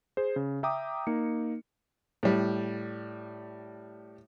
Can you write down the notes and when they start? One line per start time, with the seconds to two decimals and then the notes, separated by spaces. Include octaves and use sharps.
0.17 G#4 C5
0.36 C#3
0.63 E5 G5 A#5 D6 D#6
1.07 A#3 D#4 C#7
2.23 A2 G3